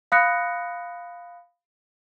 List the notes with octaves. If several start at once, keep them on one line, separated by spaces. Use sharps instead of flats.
F5 B5 D#6 F#6 A#6 C#7